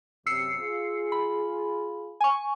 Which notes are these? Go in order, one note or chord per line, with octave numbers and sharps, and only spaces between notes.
F#2 C3 E6 C7 C#7
F4 G#4
B5
G#5 C#6